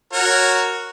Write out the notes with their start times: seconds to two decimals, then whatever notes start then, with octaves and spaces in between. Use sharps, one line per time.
0.13 F#4 A#4 C#5